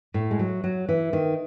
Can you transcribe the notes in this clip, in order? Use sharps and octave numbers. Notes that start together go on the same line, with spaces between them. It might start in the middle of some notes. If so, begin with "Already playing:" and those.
A2
G#3
F#3
F#3
E3
D#3